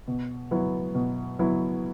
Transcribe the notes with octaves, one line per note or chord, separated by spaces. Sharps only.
B2
F#3 B3 E4
B2
F#3 B3 E4